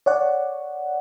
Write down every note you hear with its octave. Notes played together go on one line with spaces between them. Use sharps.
C#5 D5 F#5